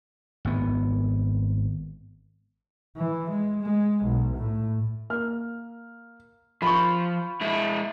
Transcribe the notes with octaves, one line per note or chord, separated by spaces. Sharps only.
G#1 B3
E3
G#3
G#3
B1
A2
A#3 F6
F3 B5 C#6
G#3 E4